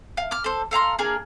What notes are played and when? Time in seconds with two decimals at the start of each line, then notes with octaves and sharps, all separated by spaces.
0.17 F5
0.31 D6 F6
0.44 A4 C5
0.71 A4 F5 A#5 C6
0.99 A#3 D4 G#4 A#4